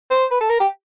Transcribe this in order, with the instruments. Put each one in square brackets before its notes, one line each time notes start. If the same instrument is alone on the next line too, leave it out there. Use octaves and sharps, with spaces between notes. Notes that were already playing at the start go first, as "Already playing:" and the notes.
[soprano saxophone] C5
B4
A4
A#4
G4